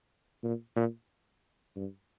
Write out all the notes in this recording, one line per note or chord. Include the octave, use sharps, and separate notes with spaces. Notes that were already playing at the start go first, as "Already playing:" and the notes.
A#2
A#2
G2